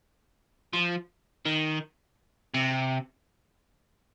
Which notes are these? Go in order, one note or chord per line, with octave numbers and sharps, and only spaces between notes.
F3
D#3
C3